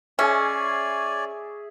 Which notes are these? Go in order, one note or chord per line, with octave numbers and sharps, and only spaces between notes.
C#4 G#4 C#5 D5 E5 G#5